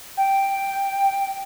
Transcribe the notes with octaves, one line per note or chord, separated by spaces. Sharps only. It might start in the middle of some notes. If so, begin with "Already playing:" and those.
G5